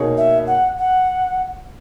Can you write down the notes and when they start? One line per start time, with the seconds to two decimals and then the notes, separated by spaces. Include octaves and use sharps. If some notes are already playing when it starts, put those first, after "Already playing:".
Already playing: B2 A#3 D#4 G#4 C#5
0.18 E5
0.47 F#5
0.78 F#5